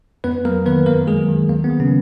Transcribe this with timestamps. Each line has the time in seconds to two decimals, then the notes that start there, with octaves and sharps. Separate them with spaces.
0.24 F2 B3 B4
0.45 F#3 A#3 A#4
0.66 D#3 B3 B4
0.86 F#2 A#3 A#4
1.07 F#3 G#3 G#4
1.29 D#3
1.49 D#2 A#3
1.64 B3
1.70 F#3
1.80 C#3 C#4